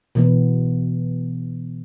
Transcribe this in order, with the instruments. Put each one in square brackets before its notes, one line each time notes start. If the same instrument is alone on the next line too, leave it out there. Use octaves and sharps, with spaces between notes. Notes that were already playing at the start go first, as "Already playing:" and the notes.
[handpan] B2 E3 B3